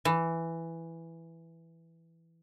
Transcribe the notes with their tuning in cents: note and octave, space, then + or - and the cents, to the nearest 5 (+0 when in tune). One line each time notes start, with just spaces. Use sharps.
E3 +5